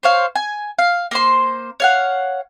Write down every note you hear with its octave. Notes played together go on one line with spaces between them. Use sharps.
C5 C#5 F5
G#5
F5
A#3 C5 C6
C#5 F5 F#5